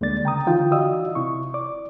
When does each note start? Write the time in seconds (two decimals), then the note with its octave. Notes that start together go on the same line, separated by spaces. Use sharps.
0.01 D2 D3 G#3 A#3 D5 A6
0.24 C#3 G5 A#5 D#6
0.47 D3 E3 D#4 F4 G5
0.72 F#4 D5 D#5 F5 D#6 E6
1.15 C3 E4 C#6
1.54 D5 D6